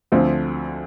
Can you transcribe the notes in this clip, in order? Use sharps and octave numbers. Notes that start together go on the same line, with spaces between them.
D2 D3 F3 C4